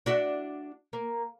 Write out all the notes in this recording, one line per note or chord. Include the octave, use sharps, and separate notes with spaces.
D4 F#4 E5
A#3